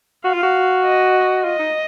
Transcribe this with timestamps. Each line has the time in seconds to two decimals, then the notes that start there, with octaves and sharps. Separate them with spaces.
0.24 F#4 F5
0.34 F4
0.43 F#4
0.84 D#5
1.44 F4 D#5
1.59 D#4